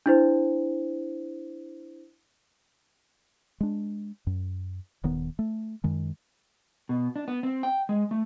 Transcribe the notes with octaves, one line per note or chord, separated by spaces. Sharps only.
D4 E4 C5
G#3 D4
F#2
D#1 D#3 B3
A3
F#2 D#3 G#3
B2
D4
B3
C4
G5
G#3
A3